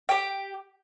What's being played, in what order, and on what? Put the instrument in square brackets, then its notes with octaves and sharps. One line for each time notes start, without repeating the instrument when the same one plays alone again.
[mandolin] G4 G5